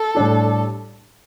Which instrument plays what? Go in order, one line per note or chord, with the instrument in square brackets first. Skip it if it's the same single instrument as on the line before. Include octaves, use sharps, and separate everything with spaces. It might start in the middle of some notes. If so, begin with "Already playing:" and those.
Already playing: [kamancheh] A4
[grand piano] A2 G3 D4 G4